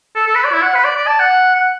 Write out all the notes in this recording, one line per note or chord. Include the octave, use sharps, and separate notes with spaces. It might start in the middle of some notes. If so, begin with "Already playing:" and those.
A4
A4
B4
D5
E4
F#5
B4
D5
D5
A5
F#5
F#5